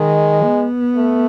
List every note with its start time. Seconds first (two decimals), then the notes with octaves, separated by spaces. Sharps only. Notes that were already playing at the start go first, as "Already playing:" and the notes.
Already playing: D#3 G#3
0.44 B3
0.96 A3